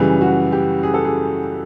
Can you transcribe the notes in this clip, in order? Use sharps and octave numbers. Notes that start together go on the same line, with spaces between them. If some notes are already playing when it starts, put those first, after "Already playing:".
Already playing: F#2 C#3 E3 G3
F#4
G4
G#4
A4
G#4